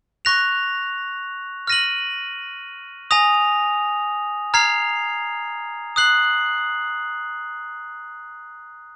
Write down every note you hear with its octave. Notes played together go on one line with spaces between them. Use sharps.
C#6 F#6 A#6 F7
F6 A#6 D#7 F#7
G#5 D#6 A#6 F7
A#5 F6 G#6 C7 F7
D#6 F#6 C7 F#7